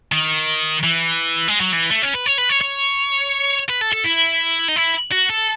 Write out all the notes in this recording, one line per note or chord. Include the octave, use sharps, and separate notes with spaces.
D#3
E3
G#3
F#3
E3
A3
C#4
B4
C#5
B4
C#5
C#5
B4
A4
A4
E4
D#4
E4
F#4
A4